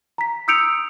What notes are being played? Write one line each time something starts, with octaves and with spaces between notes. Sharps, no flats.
A#5 B6
D#6 E6 G6 C#7 D7 F7